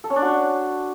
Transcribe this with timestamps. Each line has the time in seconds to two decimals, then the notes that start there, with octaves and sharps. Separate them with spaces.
0.04 A4
0.10 C#4
0.16 D4
0.22 F#4